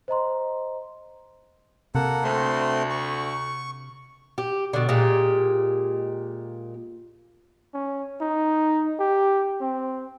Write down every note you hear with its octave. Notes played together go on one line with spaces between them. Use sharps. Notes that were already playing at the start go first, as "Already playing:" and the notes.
C5 D#5 A#5 C6
C3 A#3 A4 F#5
D2 A3 C4 C6
C#6
G4
B2 D3
A#2 G#3 G4
C#4
D#4
G4
C4